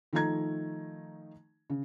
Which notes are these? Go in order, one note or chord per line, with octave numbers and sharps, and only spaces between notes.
D#3 F3 A3 D#4 A#5 G#6
C#3